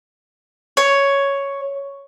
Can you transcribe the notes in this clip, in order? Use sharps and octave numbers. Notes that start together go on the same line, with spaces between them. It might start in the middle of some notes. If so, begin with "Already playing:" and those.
C#5